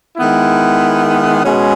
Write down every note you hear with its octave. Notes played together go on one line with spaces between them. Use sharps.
D#3 G#3 B3 E4
B2 G#3 C#4